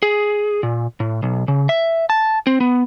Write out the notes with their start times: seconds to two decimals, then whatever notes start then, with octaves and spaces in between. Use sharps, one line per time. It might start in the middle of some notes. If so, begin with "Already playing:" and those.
0.03 G#4
0.63 A#2
1.00 A2
1.23 B1
1.48 C#3
1.69 E5
2.10 A5
2.47 C4
2.60 B3